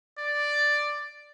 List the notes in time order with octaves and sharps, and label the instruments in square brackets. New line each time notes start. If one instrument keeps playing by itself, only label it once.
[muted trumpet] D5